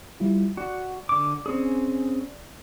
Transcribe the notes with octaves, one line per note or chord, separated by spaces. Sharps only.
G3 E4 F4
F#4 D5
D3 D6
C4 C#4 G#4